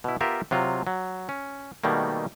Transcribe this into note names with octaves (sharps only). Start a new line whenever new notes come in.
B2 E4
B3 F4 G4 A#4 E5
C3 F#3 F4
F#3
C#4
B2 D#3 G3 A3 A#3